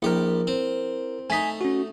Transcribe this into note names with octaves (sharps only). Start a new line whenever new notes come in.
A#1 E4 G4 A#4
C4
A3 D#4 G#5 B6
C#4 F#4